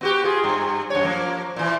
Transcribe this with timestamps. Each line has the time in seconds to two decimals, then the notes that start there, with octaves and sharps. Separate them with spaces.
0.01 B3 F#4 G4
0.24 F4 G#4
0.44 G2
0.90 F#2 C#5
1.04 F3 A#3
1.56 A#2 E3